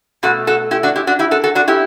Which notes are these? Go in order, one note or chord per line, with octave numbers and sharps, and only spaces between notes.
B2 A3 F#4 A4
F#4 A4
E4 G4
D4 F#4
E4 G4
D4 F#4
E4 G4
F#4 A4
F#4 A4
D4 F#4
E4 G4